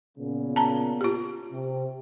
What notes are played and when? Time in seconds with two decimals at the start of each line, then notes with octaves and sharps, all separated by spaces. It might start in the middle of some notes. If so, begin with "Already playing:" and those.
0.18 A#2 C#3 B3
0.56 A5 A#5
1.01 F4 G4
1.53 C3